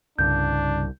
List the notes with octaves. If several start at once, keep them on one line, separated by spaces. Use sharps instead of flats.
C2 G2 C#3 D4 G6